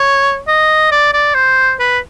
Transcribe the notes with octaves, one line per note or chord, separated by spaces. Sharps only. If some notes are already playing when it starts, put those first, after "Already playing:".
Already playing: C#5
D#5
D5
D5
C5
B4